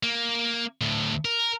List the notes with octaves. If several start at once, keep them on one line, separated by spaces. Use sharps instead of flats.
A#3
D2 A2
A#4